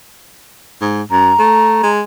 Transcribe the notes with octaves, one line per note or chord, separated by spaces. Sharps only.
G#2
F#2 A#5
A3
G#3